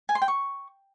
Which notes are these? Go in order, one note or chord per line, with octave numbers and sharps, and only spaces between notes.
G#5
C6
G5
C#6